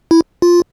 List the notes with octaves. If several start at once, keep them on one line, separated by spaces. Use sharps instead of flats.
E4
F4